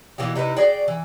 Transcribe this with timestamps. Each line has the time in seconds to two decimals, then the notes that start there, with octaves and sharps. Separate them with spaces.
0.18 B2 E3 A#3 G4
0.35 C3 D#4 E4 B4
0.56 F#4 G#4 D5 G5
0.88 E3